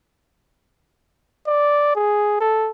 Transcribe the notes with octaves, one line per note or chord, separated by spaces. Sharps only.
D5
G#4
A4